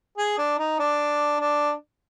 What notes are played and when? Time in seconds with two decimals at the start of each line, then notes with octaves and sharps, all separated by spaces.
0.18 G#4
0.38 D4
0.58 D#4
0.79 D4
1.40 D4